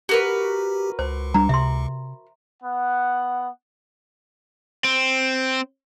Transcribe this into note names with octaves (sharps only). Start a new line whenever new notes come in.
F#4 G4 A#4 B4
C#2 C5
G3 D4 A#5
C3 E5 C6
B3 F#5
C4